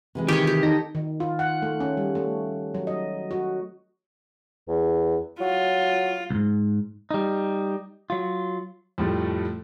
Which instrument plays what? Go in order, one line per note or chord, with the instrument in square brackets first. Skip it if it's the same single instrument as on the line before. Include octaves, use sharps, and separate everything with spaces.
[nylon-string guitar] C3 E3 G#3
[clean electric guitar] D#3 [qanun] G4 C#5
[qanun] G4
[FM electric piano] D#4 A#6 [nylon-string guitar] A4
[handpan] D#3
F4
F#5
A3
C#4
G3
A3
F#3
D#5
F#4
[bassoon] E2
[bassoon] F#3 [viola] F4
[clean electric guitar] C2 G#2
G3 D#4
F#3 F4
[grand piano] F2 A2 G3 A3